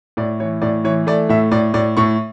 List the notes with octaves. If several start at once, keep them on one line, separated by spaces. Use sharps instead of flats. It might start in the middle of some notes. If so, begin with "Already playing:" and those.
A2 D5
E3 C#5
A2 D5
E3 C#5
A3 D5
A2 E5
A2 D5
A2 D5
A2 C#6